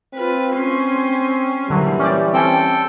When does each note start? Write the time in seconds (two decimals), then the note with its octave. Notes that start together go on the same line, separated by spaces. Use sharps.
0.14 C4 F4 B4
0.56 C#4 C6
1.70 A#2 D3 E3 F#3 G3
1.99 C#4 G4 D5
2.33 C4 C#4 A4 G5